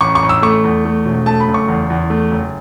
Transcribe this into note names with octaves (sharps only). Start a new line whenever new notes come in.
A1 C#6
C#6
A1
E6
A3 C#6
E2
A3
E1
A3 A5
B5
F#1
C#6
E2
E2
A3
F#1